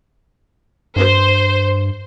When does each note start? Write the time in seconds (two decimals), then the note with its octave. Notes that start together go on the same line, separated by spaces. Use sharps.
0.96 G2 C5